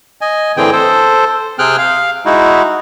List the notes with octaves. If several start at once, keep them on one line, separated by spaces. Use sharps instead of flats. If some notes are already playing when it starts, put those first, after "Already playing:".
D#5 G#5
A2 D3 E3 C4 G#4 G5
A4 C5
C3 C4 G#4 G5 F6 F#6
F5
G#3 D#4 E4 F#4